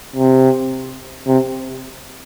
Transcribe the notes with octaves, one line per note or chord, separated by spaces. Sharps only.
C3
C3